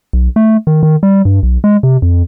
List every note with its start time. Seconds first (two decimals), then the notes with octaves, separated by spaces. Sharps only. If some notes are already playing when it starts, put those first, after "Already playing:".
0.13 B1
0.36 A3
0.67 D#3
0.83 D#3
1.03 G3
1.25 G2
1.43 B1
1.64 G#3
1.83 C3
2.02 F2